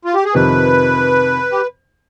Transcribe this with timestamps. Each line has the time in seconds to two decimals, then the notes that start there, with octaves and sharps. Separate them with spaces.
0.05 F4
0.15 G4
0.25 G#4
0.34 F2 C3 D#3 B4
1.52 G4